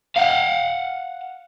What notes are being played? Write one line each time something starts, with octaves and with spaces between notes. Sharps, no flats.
F5 F#5